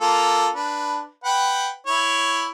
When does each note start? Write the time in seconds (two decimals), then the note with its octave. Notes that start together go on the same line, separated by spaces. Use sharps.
0.01 A#3 F4 A4
0.54 D4 B4
1.24 B4 F#5 G5
1.87 E4 C#5